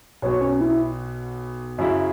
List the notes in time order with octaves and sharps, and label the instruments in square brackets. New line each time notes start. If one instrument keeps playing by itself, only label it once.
[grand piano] B1 B2 F#3 [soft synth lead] C#5
[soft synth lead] C#4
E4
[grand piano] F#2 C#3 F#3 E4